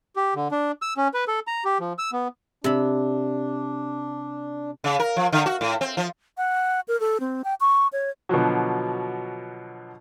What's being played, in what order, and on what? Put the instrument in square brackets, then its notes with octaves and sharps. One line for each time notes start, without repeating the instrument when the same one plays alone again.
[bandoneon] G4
D3
D4
E6
C#4
B4
A4
A#5
G4
F3
E6
B3
[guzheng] C3 B5 [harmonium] D4
[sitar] C#3
A#4
F3
D3
F#4
A2
C4
F3
[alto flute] F#5
A#4
A4
C4
G5
C#6
C#5
[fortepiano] B2 D3 F3 F#3